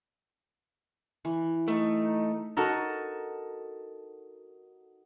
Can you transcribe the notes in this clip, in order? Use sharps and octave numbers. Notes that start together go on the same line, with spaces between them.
E3
A3 D#4
D#4 F#4 A4 A#4